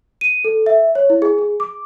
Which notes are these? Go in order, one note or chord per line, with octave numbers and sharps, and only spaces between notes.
D#7
A4
E5
C#5
E4
G#4
G#4
D6